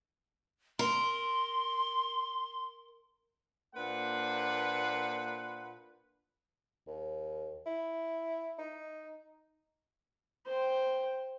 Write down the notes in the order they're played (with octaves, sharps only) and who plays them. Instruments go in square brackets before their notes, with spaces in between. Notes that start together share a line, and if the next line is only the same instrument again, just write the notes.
[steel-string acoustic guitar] A#4 [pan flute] C6
[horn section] A#2 A#3 D4 B4 C5 F#5
[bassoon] D#2
E4
D#4
[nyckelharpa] C5 G5